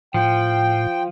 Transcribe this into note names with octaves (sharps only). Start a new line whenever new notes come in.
A2 F3 G5